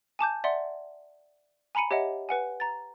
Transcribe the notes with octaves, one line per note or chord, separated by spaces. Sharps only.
G#5 A5 D6 G6
D5 E5 F#5 C6
G#5 A#5 B5 C#7 D#7
G4 C#5 D#5 E5 F#5
B4 F#5 G#5
A#5 A6